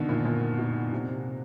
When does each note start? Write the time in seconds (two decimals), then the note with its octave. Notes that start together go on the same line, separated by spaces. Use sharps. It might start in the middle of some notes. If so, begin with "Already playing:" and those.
Already playing: B2 D3 D#3
0.09 A#2
0.25 A#2
0.59 B2
0.93 C3